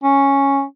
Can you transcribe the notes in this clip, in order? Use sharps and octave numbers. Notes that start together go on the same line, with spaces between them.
C#4